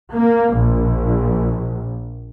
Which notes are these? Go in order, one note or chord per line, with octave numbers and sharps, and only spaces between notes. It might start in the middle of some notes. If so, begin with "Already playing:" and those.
A#3
A#1